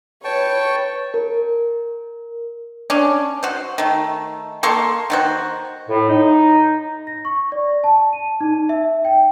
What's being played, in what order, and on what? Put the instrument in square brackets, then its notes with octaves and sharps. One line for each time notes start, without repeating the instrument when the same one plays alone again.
[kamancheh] B4 C#5 [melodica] G5 A5 C#6
[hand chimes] A#4
[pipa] C#4 D4
F#4 C5
D#3 A3
A#3 A4 C6 C#6
D#3 F#4 C5
[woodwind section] A2
D#4
[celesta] A#6
C#6
D5
A5
D#7
D#4
E5
G5